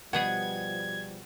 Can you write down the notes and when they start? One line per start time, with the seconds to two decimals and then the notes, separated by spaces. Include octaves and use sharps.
0.13 B2 F3 G3 B3 G#4 F#5 G#6